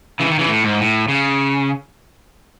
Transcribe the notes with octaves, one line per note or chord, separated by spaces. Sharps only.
C#3 E3
D#3
C#3 E3
A2
G#2
A2
C#3